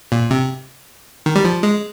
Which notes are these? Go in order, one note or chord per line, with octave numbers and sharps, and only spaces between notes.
A#2
C3
D#3
G3
F3
G#3